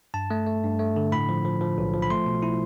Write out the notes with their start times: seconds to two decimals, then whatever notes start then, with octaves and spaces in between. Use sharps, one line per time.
0.14 G2 A5
0.31 A3
0.47 A3
0.64 G2
0.79 A3
0.96 D3
1.12 A2 B5
1.29 F3
1.45 F3
1.61 F3
1.78 B1
1.94 F3
2.02 B5
2.10 A3 C6
2.26 B2
2.43 E4